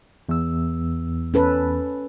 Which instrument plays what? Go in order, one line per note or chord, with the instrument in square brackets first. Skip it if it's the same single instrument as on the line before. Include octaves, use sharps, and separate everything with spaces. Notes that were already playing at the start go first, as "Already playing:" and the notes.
[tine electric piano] E2 E6
[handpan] C#4 A4 B4